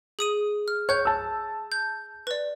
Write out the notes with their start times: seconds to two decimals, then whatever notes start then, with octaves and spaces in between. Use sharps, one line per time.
0.19 G#4 D#6 D#7
0.68 F6
0.89 C#5 F#6 G6
1.05 A5 E6
1.72 G6
2.27 B4 D5